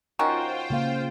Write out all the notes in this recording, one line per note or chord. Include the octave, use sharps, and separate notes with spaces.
D#3 C#4 F4 F#4 C5 G5
C#3 A#3 F5